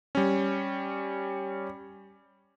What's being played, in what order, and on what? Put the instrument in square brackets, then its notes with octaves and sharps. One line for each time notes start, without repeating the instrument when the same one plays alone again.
[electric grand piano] G3 C#4